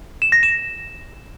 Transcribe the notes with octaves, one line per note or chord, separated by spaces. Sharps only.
E7
A#6
E7